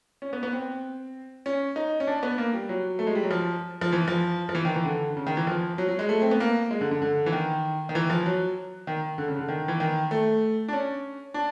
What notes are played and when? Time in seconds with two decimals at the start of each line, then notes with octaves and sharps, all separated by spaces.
0.22 C#4
0.33 B3
0.43 B3
0.53 C4
1.46 C#4
1.76 D#4
2.00 C#4
2.07 D4
2.23 B3
2.38 A#3
2.53 G3
2.69 F#3
2.99 A3
3.07 G#3
3.15 G3
3.24 F#3
3.31 F3
3.81 F3
3.93 E3
4.08 F3
4.49 F3
4.55 E3
4.65 D#3
4.76 E3
4.85 D3
5.17 C#3
5.27 D#3
5.37 E3
5.47 F3
5.78 F#3
5.89 F#3
5.99 G#3
6.09 A3
6.22 C4
6.31 B3
6.40 A#3
6.71 G#3
6.81 D3
6.91 D3
7.02 D3
7.26 E3
7.33 D#3
7.89 D#3
7.95 E3
8.10 F3
8.26 F#3
8.87 D#3
9.18 D3
9.28 C#3
9.39 D3
9.49 D#3
9.68 E3
9.80 D#3
10.11 A3
10.68 D4
10.73 C#4
11.34 D4